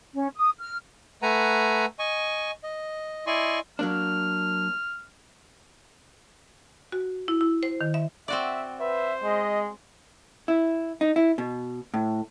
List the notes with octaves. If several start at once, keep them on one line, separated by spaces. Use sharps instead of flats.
C#4
D#6
F6
A3 B4 F#5 G#5 A#5
D#5 G#5 C#6
D#5
E4 D5 D#5 G#5 C6 C#6
F#3 A#3 D4 F6
F#4
E4
E4
C5
D#3
E5
C4 F#4 D5 E5
B4 C5 E5
G#3 D#5
E4
D#4
E4
B2
A2